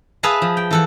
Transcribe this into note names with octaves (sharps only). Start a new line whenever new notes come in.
G#4 B4 E5 F5 G#5 A5
F3
G5
E3 A4 F#5